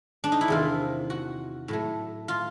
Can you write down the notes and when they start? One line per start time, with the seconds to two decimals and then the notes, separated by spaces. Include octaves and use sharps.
0.24 D4
0.32 D#4
0.41 E4
0.48 E2 C3 D#3 F4
1.10 F#4
1.68 A2 F#3 A3
2.28 F4